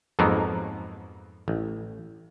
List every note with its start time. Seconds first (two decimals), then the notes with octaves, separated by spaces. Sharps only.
0.19 F2 G#2 F3 F#3 A#3 B3
1.48 A1